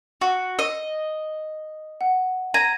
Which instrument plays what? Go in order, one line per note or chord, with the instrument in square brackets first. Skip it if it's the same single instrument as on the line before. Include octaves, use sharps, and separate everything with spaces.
[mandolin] F#4
D#5
[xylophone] F#5
[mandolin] A#5 [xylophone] G#6 D#7